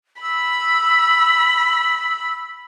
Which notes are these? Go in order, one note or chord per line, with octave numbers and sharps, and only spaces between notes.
B5 E6